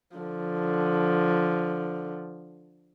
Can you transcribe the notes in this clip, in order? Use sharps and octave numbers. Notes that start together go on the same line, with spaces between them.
D3 F3